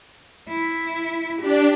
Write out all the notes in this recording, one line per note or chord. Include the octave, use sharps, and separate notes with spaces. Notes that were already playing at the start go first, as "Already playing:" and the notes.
E4
D4 G4